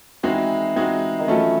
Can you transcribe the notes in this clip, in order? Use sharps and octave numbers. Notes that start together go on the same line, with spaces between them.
E3 G#3 C4 D#4 F#4
G#3 C4 D#4 F#4
D#3
E3 F#3 A3 C#4 F4 A4